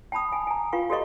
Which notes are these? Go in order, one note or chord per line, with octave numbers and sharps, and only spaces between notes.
G5 A5 B5 D#6
G#5
G#5 A#5
F4 B4 F5 G5 C#6
F#4 G4 A4 B4 D#5 C#6